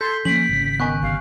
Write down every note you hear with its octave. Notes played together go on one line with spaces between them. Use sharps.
A4 C6 G6 G#6 B6 C7
F3 G3 A#3 C#4 B6 C7 D7 F#7
G#1 C#3
D#3 B3 G#5 C#6 F#6
G1 F5